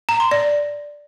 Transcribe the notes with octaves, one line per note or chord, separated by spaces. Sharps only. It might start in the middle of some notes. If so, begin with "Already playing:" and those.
A#5
C6
D5